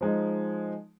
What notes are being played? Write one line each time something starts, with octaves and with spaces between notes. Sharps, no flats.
F3 G#3 D#4